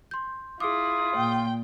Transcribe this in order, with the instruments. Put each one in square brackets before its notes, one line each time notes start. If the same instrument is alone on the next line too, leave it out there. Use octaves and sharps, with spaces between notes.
[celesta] C6 G6
[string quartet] E4 [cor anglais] F4 [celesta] G#4 D6 [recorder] D#6
[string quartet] A#2 G5